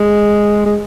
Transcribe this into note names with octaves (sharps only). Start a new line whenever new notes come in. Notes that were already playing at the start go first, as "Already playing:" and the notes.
Already playing: G#3
G#3